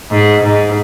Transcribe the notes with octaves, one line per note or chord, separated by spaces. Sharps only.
G#2
G#2